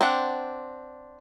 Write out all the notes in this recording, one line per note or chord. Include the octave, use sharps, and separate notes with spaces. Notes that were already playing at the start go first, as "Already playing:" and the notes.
C4 D4 F#5